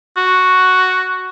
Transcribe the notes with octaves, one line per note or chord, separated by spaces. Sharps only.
F#4